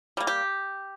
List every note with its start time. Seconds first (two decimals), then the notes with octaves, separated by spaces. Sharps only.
0.17 G3 A#3
0.27 G4